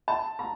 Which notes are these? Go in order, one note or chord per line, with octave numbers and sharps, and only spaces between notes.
A5
A#5